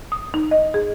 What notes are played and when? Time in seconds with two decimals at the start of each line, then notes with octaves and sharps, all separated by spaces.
0.12 D#6
0.34 D#4
0.51 D#5
0.74 G#4